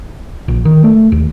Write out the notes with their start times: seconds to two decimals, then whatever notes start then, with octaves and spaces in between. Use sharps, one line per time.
0.48 A#1
0.65 D#3
0.84 A3
1.12 D#2